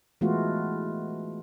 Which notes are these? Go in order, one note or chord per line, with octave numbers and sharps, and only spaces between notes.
E3 G#3 A3 B3 F4 F#4